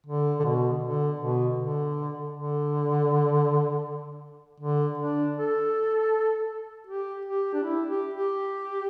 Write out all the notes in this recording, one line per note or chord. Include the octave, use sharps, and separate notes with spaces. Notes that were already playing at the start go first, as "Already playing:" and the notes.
D3
D3
B2
D3
B2
D3
D3
D3
D4
A4
G4
G4
D4
E4
G4
G4